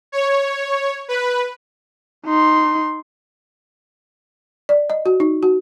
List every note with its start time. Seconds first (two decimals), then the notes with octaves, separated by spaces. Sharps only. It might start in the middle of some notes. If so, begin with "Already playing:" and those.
0.12 C#5
1.08 B4
2.26 D#4 C6
4.69 D5
4.90 D#5
5.06 F#4
5.20 D#4
5.43 F#4